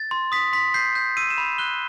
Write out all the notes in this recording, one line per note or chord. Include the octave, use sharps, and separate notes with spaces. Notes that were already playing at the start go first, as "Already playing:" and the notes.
Already playing: A6
C6
D#6 B6
C6 B6
G6 C7
G6
E6 D#7
E7
B5
F#6 G7